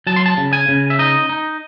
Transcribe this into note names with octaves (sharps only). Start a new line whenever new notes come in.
F#3 A5
C6
A5
C#3
G#5
C#3
E5
D#4 D#5
D#4